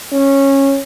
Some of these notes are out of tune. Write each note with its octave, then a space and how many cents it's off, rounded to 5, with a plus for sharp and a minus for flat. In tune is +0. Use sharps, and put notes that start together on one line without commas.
C#4 -15